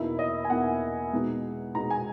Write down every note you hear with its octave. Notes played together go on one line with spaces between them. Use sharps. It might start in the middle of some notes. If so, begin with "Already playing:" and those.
Already playing: E2 B2 A#3 D#4 E4
D#5
G#5
E2 B2 A#3 D#4 F#5
B2 G#3 B3 D#4
B2 G#3 B3 D#4 A#5
G#5